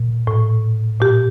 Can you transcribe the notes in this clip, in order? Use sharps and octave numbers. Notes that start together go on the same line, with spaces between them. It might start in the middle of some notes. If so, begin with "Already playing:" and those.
Already playing: A#2
A2
A#2 G4